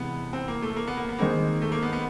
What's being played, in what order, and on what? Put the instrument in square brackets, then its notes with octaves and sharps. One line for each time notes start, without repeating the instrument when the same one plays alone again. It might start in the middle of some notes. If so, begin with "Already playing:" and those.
Already playing: [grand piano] C3 E3 G#3 [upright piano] B3
[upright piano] C4
A#3
A3
A#3
B3
A#3
B3
[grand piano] D#3 G#3 C4 [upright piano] A#3
[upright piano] A3
A#3
B3
B3